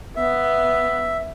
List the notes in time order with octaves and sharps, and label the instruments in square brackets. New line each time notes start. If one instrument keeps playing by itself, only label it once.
[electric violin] B3 [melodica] E5